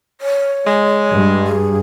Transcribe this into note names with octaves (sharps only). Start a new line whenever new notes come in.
C#5
G#3
G2
G#4